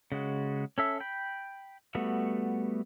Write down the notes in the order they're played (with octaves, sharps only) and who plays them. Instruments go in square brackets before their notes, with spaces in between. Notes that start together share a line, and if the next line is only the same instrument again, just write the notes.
[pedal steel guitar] C#3 G#3 F#4
C#4 A4 E5
G5 B5
G3 A3 B3 F#4